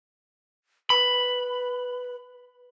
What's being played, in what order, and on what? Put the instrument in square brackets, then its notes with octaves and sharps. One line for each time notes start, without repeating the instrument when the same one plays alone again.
[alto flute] B4 [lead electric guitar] B5